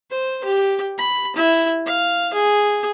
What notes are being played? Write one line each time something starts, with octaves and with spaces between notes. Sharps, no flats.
C5
G4
B5
E4
F5
G#4